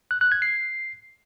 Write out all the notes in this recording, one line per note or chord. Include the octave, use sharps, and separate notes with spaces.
F#6
F#6
G#6
C7